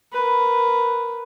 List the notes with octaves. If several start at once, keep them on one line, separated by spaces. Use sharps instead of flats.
A#4 B4